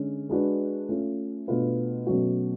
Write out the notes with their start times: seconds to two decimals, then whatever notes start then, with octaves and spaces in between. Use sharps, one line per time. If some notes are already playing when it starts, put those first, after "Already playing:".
Already playing: D3 G#3 C#4
0.29 G#3 D4 F#4 B4
0.89 A3 C#4 F4
1.48 B2 A3 D4 F4 B4
2.07 B2 F#3 A3 C#4 F#4